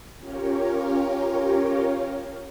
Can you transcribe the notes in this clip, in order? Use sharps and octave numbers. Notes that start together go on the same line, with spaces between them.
C#4 F4 G4 A#4 C#5